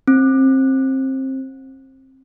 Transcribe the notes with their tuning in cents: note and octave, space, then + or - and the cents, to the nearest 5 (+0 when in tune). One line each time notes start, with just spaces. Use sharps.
C4 +25